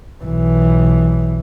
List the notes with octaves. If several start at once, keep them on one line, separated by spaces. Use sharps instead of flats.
B1 E3